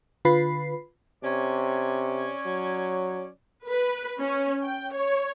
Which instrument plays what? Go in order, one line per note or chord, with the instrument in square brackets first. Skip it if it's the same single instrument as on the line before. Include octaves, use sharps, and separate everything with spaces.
[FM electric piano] D3 F4 B4 B5 C7
[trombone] C3 [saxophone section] C#4 C#5 D5
[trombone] F#3
[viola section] B4
C#4
G5
C#5